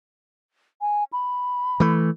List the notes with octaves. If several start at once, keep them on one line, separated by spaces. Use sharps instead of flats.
G#5
B5
E3 A3